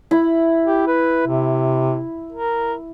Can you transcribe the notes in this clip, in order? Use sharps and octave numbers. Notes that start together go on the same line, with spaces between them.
E4
G4
B4
C3
A#4